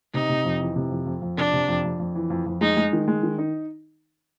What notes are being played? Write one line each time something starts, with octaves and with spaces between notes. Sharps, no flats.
C3 D#4
C3
F2
E3
C3
F2
F2
F2
C3 D4
C3
F2
F2
F2
E3
F2
F2
G#3 D#4
G#3
D#3
G#3
D#3
D#4